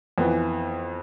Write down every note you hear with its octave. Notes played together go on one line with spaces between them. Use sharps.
F2 E3 B3